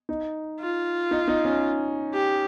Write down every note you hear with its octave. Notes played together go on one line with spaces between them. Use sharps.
D#4
F4
D#4
D#4
C#4
G4